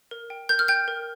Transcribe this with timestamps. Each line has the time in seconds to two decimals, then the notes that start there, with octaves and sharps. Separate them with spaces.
0.11 A#4
0.30 G5
0.49 A#4 G6
0.59 F6
0.68 G5 G6
0.88 A#4